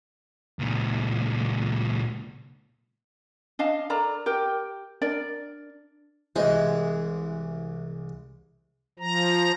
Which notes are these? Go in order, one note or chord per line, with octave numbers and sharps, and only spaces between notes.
C#2 A#2
D4 D#5 F5 A5
A4 A#4 D5 A#5
G4 A#4 G5
D4 A#4 D5
C2 E3 G#3 C5 D#5
F3 A#5